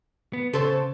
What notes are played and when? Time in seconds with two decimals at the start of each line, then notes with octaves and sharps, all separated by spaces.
0.33 B3
0.53 C#3 A4 C5 C#5